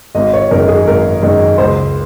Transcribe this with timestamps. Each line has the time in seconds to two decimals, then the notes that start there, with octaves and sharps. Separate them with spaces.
0.15 G#1 D#5
0.34 C#5
0.51 F#2 D#3 G#3 A#4
0.68 G#4
0.86 G#1 A#4
1.22 F#2 D#3 G#3
1.58 C#2 C5